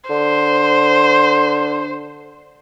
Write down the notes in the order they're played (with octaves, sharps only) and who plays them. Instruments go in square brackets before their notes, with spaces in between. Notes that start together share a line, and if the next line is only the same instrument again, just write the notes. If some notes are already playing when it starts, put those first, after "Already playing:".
[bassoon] D3 [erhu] C5